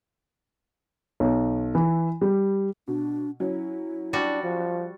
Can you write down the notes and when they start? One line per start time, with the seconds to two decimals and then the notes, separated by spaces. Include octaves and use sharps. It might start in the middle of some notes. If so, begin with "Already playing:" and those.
1.20 B1
1.75 E3
2.21 G3
2.88 B2 D4
3.40 F#3 C#4 E4
4.13 G3 D4 F#4
4.44 F3